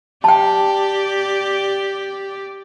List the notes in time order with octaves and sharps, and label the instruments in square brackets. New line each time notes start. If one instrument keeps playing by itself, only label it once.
[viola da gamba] G4 D5 [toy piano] G5 A5